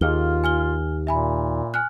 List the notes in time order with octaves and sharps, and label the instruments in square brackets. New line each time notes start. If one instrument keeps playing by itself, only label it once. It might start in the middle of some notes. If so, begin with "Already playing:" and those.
[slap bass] D#2 [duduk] F4 [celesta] G#4 F6 G7
[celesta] G#5 F6 G7
[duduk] A#2 [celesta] E5 G#5 B5
[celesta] G#5 F6 F#6